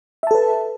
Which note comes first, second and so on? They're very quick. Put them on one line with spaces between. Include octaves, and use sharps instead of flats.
E5 A5 A4 B4